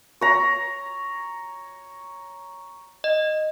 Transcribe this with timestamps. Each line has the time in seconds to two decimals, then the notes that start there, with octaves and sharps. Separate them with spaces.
0.21 C#5 A#5
3.04 D#5